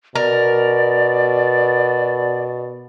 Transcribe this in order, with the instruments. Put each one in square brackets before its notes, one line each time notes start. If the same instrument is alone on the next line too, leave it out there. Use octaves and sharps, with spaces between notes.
[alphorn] B2 [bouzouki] A#4 [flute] D5